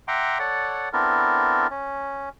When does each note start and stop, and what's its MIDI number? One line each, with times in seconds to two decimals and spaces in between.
0.08 0.38 76
0.08 0.38 78
0.08 0.38 79
0.08 0.38 82
0.08 0.38 84
0.08 0.38 86
0.39 0.89 69
0.39 0.89 73
0.39 0.89 74
0.39 0.89 78
0.93 1.67 59
0.93 1.67 60
0.93 1.67 62
0.93 1.67 64
0.93 1.67 69
0.93 1.67 70
1.70 2.29 61